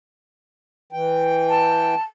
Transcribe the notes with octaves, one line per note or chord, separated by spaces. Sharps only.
E3 G5
A5